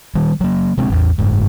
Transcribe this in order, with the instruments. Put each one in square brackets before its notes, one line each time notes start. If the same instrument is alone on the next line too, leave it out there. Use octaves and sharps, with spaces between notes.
[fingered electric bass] D#3 G3
F#3 A#3
C3 G#3 C4 D4
A1 E2
F#1 G#2